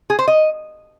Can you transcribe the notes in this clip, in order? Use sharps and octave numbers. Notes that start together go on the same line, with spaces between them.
G#4
C5
D#5